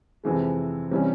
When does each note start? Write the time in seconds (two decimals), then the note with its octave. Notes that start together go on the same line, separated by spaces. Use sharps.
0.24 F2 C3 E3 G#3
0.91 C3 E3 G3 C#4